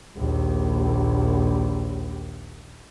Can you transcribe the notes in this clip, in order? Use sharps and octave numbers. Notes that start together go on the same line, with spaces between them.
A#1 D#2